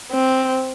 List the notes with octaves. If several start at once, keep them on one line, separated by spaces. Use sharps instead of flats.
C4